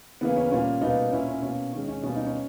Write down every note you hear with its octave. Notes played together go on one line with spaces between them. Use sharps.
C#3 E3 A#3 B3
C#4
A#2 G3 A#3 C#4
B2 G3 A#3 B3 D#4
A#2 A#3 C#4 E4
C#4
B2 A#3 C#4
D#3 G#3 C#4
C#4
B2 G3 A#3 C#4
D#4
C#4